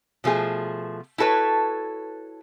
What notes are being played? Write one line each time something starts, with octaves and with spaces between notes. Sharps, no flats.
B2 F3 A3 G#4
E4 F#4 A4 B4 C#5